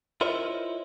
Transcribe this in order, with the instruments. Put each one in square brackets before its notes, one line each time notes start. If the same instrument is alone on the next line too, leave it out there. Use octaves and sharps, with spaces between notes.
[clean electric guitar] E4 F4 A#4 C5 C#5 D#5